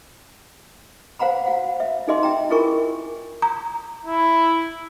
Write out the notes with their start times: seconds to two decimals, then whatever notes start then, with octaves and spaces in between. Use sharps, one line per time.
1.19 C5 F5 F#5 A#5 B5
1.46 F#4 F5 F#5
1.80 E5
2.08 D#4 F#4 G#4 D#5 E5 C6
2.23 E5 G5 A#5
2.50 E4 F4 G#4 A#4 G#5 C#6
3.42 A#5
4.05 E4